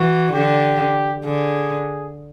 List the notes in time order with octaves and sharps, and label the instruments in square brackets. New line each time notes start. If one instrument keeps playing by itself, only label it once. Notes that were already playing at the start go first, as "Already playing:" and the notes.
Already playing: [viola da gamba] E3 [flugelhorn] F#4
[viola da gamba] D3 [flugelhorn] G4
[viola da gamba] D3 [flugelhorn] G#4